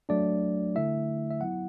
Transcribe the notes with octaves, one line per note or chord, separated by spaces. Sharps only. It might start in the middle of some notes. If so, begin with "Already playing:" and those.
F#3 A3 D4 D5
D3 A3 E4 E5
E5
F#3 B3 E4 F#5